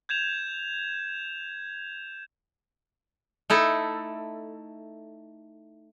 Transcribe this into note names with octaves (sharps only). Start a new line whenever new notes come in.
G6 G#6 E7 F7
A3 D#4 E4 A4